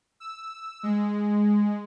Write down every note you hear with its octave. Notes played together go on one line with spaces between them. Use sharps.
E6
G#3